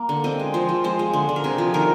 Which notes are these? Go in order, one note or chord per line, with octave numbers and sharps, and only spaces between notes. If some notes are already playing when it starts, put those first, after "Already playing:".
Already playing: A#3
D3
C4 D#5
G#3
F3 C5
F3
G#3 C5
G#3
D3
D3
A#4
C3 G#4
F3
D#3 A#4